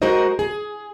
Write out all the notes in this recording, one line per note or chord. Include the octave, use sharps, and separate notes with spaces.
G#3 D#4 F#4 A#4 C5 D#5
G#4